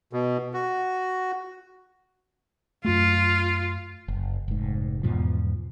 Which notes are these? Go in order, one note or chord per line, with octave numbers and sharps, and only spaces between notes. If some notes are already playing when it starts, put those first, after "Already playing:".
B2
F#4
F#2 A3 F4
F#1
F1 G#2
E2 G#2 B2 F3